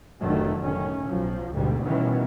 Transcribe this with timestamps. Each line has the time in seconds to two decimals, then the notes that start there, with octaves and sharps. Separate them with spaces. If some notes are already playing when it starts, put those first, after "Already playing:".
0.20 F1 A2 D3 D#3 F#3 A3
0.62 F1 A2 D#3 C#4
1.07 B1 F3 F#3
1.53 D2 G#2 B2 G3
1.84 B2 D#3 E3 G3 B3 C#4